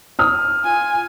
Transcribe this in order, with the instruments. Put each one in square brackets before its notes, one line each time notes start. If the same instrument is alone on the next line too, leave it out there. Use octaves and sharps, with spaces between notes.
[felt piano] D#6 F6
[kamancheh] F4 G#5